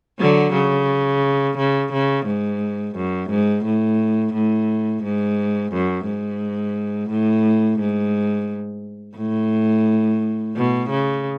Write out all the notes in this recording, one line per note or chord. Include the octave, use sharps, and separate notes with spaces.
D3 F#3
C#3
C#3
C#3
G#2
F#2
G#2
A2
A2
G#2
F#2
G#2
A2
G#2
A2
B2
C#3